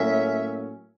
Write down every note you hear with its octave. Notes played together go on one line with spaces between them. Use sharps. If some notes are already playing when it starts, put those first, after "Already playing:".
Already playing: A2 F#3 A#3 C#4 E5